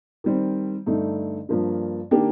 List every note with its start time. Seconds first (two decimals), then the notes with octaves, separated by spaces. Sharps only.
0.24 D#3 G3 C4
0.86 G2 D3 A3 D#4
1.49 G2 F3 A#3 D4
2.11 D#3 A#3 D4 G4